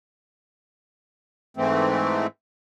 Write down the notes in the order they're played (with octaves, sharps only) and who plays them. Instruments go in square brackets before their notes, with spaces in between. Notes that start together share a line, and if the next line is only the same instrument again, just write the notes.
[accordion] G#2 E3 A3 C4